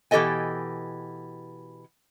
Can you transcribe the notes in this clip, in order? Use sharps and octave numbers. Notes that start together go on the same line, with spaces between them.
B2 E3 G4 A4 D#5 G#5